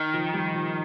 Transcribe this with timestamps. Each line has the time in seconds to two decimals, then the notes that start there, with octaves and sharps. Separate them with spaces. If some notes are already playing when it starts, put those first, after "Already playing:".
Already playing: D#3
0.14 F3
0.34 G3
0.54 F3